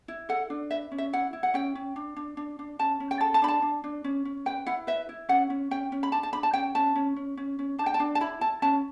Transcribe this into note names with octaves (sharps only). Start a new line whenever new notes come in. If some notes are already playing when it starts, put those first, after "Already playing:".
E4
A4 F#5
D4
B4 E5
C#4
E5
E4 F#5
E4
F#5
C#4 G5
C#4
D4
D4
D4
D4
C#4 A5
C#4
G5
A4 A5
A5
D4 B5
A5
D4
D4
C#4
C#4
B4 G5
E4 F#5
B4 E5
E4
C#4 F#5
C#4
C#4 G5
C#4
B5
D4 A5
A5
D4 B5
A5
C#4 G5
C#4 A5
C#4
C#4
C#4
C#4
D4 A5
G5
A5
D4
A5
E4 B5
E4 A5
C#4 A5